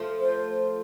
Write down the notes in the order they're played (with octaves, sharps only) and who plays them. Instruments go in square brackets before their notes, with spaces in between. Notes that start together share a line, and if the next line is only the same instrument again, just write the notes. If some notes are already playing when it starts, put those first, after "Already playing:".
Already playing: [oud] F3 A3
[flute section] C5